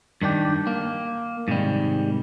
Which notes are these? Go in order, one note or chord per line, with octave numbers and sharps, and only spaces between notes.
G2 D#3 D4 G4
A#3
G#2 C3 D#3 G3